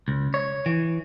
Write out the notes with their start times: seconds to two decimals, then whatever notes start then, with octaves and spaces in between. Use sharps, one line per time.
0.08 C#2
0.34 C#5
0.66 E3